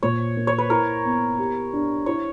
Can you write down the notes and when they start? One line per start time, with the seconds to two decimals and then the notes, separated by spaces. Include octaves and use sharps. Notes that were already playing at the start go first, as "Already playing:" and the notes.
0.03 A#2 C#5
0.37 A#3
0.47 C#5
0.58 B4
0.70 E4 A#4
1.05 B3
1.39 G4
1.73 D4
2.06 E4 C#5